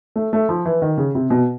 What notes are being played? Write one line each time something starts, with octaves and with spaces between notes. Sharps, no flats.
A3
A3
F3
E3
D#3
C#3
C3
B2